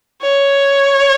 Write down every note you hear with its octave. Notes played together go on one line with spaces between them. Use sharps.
C#5